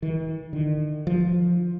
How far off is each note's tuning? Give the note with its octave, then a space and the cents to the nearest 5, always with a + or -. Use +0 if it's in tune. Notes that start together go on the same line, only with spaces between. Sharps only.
E3 -45
D#3 -45
F3 +10